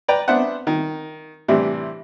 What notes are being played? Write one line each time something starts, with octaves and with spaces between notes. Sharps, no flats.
B4 D5 G5 A#5
B3 D4 C5 E5 F#5
D#3
A2 C3 E3 G3 D4 E4